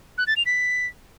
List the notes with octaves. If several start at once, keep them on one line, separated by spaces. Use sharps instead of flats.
F#6
A6
F7
B6